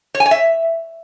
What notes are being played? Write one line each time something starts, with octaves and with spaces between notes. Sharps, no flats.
C#5
G#5
C#5
E5